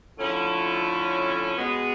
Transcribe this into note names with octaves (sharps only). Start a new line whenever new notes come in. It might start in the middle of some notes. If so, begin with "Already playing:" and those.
D3 F3 A3 C#4 E4
B2 G#3 B3